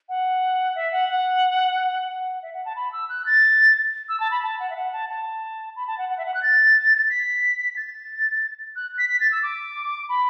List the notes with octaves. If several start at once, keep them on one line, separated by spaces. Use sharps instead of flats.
F#5
E5
F#5
F#5
F#5
E5
F#5
A5
B5
E6
F#6
A6
E6
A5
B5
A5
F#5
E5
F#5
A5
A5
B5
A5
F#5
F#5
E5
F#5
F#6
A6
B6
A6
F#6
B6
B6
A6
E6
D6
B5